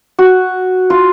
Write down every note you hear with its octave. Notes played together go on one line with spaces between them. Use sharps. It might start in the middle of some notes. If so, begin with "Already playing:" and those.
F#4
F4